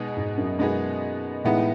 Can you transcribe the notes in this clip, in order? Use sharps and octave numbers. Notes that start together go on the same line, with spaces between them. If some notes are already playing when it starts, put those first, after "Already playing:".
Already playing: B2 G#3 B3 D#4 G#4
G#2
F#2
F#2 B2 G#3 B3 D#4 G#4
A2 E3 G#3 B3 D#4